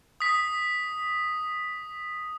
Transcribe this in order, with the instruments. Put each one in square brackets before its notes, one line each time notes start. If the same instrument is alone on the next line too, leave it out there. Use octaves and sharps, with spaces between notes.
[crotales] D#6 B6